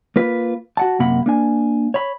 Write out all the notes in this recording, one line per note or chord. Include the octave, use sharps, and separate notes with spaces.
A#3 F4 B4
F#4 F#5 A5
F#2 C3 A#3 F#5 B5
A#3 D4 G#5
C#5 B5